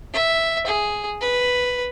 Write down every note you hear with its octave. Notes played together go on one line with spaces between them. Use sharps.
E5
G#4
B4